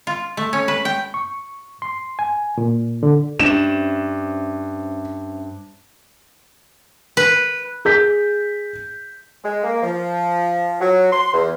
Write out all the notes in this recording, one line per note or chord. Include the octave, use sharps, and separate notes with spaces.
F4
A3
C#4
B4
G5
C#6
C6
G#5
A#2
D3
G2 C#4 D4 C5 E5 E7
B4
G#4 G6 B6
G#3
A#3
F3
F#3
C6
E2